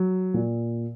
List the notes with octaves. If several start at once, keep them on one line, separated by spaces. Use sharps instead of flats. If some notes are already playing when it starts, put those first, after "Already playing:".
Already playing: F#3
A#2